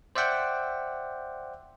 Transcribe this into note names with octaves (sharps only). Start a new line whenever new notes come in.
C5 D5 E5 F#5 G5